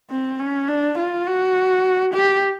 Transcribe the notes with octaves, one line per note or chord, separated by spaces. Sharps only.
C4
C#4
D4
F4
F#4
G4